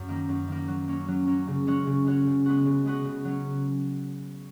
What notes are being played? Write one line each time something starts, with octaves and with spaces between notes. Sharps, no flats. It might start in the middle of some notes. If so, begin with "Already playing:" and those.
Already playing: F#2
D#3 A#3
F#2
D#3 A#3
F#3
A#3 C#4
F#3
A#3 C#4
C#3
G#3 C#4 F#4 C#5
C#3
G#3 C#4 F#4 C#5
C#3
G#3 B3 F#4
C#3
G#3 B3 F#4
C#3
F#3 C#4